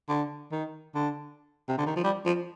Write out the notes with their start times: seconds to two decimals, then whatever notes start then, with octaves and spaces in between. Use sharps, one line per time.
0.08 D3
0.51 D#3
0.95 D3
1.68 C3
1.78 D3
1.86 D#3
1.96 F3
2.04 G3
2.26 F3